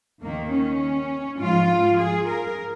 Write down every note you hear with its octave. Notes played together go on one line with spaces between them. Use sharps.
D#2 D#3 A#3
C#4
G#2 F3 F4
G#4
A#4